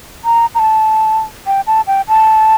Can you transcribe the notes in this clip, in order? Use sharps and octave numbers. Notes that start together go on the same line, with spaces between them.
A#5
A#5
A5
G5
A5
G5
A5